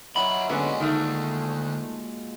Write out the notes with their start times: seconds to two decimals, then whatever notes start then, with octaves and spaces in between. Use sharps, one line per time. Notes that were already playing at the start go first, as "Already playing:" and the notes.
0.16 F#3 F4 F#4 D#5 E5 B5
0.49 A#2 D3 G#3 B3 C#4 C#5 D#5
0.80 D2 D#3 A3